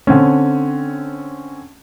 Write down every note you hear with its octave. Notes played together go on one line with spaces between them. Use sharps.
D3 C4 C#4